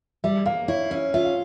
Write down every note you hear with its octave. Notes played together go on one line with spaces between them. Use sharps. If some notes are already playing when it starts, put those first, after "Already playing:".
G3 E5
A#3 F5
E4 C#5
C#4 E5
F4 E5
F5